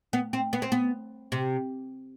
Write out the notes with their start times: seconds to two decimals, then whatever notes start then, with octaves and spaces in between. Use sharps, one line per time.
0.13 B3
0.33 C4
0.53 B3
0.62 C4
0.72 B3
1.32 C3